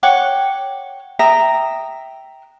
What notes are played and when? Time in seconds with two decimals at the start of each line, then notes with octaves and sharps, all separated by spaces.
0.03 C#5 F#5 G5 D6
1.19 E5 G5 A#5 D#6